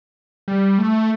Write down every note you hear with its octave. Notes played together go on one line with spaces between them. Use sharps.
G3
A3